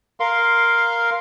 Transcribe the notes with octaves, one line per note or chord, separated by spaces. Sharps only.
A#4 F5 C6